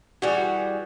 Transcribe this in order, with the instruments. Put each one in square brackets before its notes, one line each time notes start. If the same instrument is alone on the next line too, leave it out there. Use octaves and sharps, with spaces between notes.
[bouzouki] E3 G3 G#4 [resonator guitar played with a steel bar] F#4